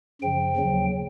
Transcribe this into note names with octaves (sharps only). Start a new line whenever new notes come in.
F#2 C#3 F3 G5
D#2 C#3 F#3